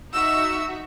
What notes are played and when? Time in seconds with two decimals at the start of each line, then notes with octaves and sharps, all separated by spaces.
0.13 D#4 F#4 E5 E6